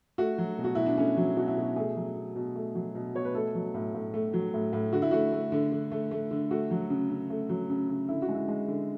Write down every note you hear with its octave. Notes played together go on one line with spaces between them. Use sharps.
A3 F#4
F#3
B2
F#4
B2 E4
D4
A3 C#4
F#3
B2 F#4
E4
B2 F#4
A3 G#4
F#3
B2
B2
A3
F#3
B2
B2 C#5
B4
A3 A4
F#3
A2
A2
A3
F#3
A2
A2
D3 F#4
E4
A3 F#4
A3
D3
D3
A3
A3
D3
A3 F#4
F#3
C#3
C#3
A3
F#3
C#3
C#3
D3 E4
F#4
G#3
E4
G#3
D3